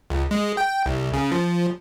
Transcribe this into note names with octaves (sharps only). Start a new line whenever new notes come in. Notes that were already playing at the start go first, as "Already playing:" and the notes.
C#2
G#3
G5
C2
C#3
F3